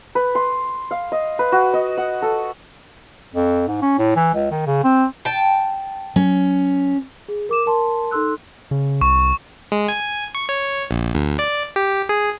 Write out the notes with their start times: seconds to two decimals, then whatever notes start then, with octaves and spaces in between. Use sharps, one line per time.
0.15 B4
0.35 C6
0.91 F5
1.12 D#5
1.39 B4
1.52 F#4
1.74 D#5
1.97 F#5
2.22 A4
3.35 F2
3.68 G#2
3.82 C#4
3.98 A2
4.16 E3
4.34 C#2
4.51 D#3
4.67 C#3
4.84 C4
5.25 G5 A5
6.16 F#3 C#4
7.28 G#4
7.49 A#4 D6 E7
7.66 A#4 A5 C6
8.11 D#4 A4 C6 E6 F#6
8.71 C#3
9.01 C2 C#6
9.72 G#3
9.88 G#5
10.35 C#6
10.49 C#5
10.91 A#1
11.14 D2
11.39 D5
11.76 G4
12.09 G#4